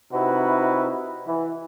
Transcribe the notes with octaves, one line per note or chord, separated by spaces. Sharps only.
C3 D#4 E4 F#4 B4
E3